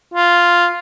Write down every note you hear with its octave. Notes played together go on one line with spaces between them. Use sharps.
F4